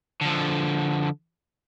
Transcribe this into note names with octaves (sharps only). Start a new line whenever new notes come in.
D3 F3